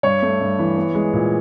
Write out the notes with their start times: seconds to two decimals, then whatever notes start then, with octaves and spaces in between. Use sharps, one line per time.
0.03 G2 C#5
0.22 A3
0.41 G2
0.59 E3
0.76 B3
0.95 G#3
1.13 A#2